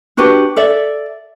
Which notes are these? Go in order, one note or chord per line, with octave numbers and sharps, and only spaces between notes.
D4 F#4 G4 B4
A4 D5 E5